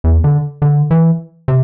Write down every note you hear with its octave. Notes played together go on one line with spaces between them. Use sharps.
E2
D3
D3
E3
C3